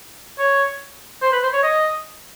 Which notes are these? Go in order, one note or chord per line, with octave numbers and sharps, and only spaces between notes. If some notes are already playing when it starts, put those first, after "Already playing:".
C#5
C5
B4
C5
C#5
D#5